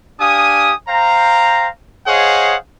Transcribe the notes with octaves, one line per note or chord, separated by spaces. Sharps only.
D4 G4 F5 G#5 D#6
C5 F5 G5 A#5
G#4 C5 C#5 D#5 F5 F#5